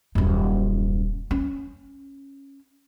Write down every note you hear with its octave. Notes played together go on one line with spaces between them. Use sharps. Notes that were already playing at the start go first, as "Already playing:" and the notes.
D#1 F#2
C#4